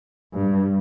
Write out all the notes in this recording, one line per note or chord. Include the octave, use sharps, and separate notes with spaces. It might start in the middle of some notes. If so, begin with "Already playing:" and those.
G2